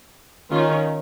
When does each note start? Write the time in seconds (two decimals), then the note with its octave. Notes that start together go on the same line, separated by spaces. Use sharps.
0.51 D#3 C#4 F4